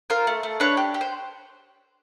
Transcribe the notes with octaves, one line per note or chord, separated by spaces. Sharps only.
F4 A#4 C5
A3
A3
D4 B4 C#5
G4
G4
C5